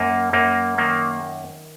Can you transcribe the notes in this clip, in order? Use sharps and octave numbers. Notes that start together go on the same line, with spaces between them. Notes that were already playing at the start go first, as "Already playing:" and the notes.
Already playing: F#2 A#3
F#2 A#3
D#3 A#3